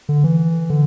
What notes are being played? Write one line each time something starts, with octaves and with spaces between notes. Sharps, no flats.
D3
E3
D3